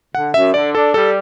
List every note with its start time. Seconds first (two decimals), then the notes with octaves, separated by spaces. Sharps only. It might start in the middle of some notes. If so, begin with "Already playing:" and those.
0.14 D3 F#5
0.34 F#2 E5
0.54 D3 D5
0.75 D4 A4
0.94 G3 A4